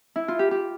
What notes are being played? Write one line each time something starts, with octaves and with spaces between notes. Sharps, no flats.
E4
F4
G4
G4